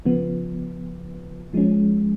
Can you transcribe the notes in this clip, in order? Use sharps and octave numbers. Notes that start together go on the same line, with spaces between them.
C#3 F3 B3
F3 G#3 C#4